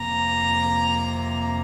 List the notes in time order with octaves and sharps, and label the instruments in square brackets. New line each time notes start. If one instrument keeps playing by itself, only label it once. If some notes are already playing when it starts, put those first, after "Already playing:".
Already playing: [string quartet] F2 C3 A#3 A#5